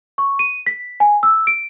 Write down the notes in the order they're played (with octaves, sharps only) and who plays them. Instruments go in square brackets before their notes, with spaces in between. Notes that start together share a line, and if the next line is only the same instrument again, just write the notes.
[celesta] C#6
D#7
B6
G#5
E6
D7